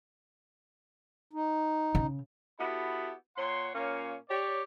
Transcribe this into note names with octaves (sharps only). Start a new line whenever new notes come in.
D#4
C#3
B3 E4 F#4 G4 A4 B5
A#2 C#5 F#5 C6
A#2 A#3 C#4 C#5 F5
G4 C#5 D5